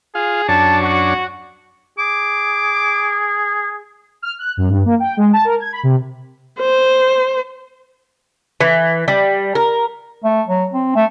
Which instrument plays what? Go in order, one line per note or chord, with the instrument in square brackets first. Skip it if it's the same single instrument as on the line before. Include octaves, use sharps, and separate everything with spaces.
[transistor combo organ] F4 F5 [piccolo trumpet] G#4
[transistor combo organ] F#2 D4 C#5 [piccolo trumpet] A5
[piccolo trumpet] F#4
[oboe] G#4 [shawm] D6
[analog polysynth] F6
F#6
F#2
G2
A#3
G5
G#3
A5
A#4
G#6
B5
C3
[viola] C5
[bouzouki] E3
G3
A#4
[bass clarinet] A3
F#3
C4
A3